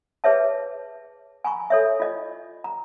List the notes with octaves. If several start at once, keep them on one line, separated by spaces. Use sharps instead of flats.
G#4 B4 C#5 E5 A5
G#5 A#5 B5 C#6
A4 C#5 E5
F4 D#5
A#5